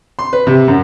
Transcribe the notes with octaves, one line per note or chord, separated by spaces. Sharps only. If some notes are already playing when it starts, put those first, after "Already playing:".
C6
B4
C3
F#2